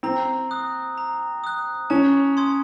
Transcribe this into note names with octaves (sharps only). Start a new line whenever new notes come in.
C4 A#5
D#6 F#6
A#5
D#6 F#6
C#4 A5
C6 D#6 G#6